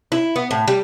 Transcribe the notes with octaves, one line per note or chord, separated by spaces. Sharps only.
E4
B3
A2
G3